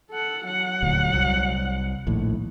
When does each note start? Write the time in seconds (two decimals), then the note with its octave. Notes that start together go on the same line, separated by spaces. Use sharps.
0.11 A4 F#5
0.47 F#3 F#5
0.82 D#1 D2
1.13 C2
2.07 A#1 D#2 A2